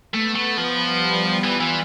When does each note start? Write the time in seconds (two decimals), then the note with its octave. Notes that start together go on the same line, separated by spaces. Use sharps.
0.14 A3 B3
0.35 A3
0.58 F3
0.79 G3
1.12 G3
1.44 E3 F4
1.61 E3